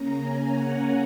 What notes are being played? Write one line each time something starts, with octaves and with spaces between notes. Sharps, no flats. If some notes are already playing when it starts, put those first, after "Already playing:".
Already playing: C#3 A#3 C#4 A#5
G#5
F#5